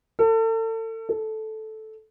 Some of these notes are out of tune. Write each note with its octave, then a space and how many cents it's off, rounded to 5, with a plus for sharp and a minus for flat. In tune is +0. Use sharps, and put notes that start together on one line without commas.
A4 +35
A4 -10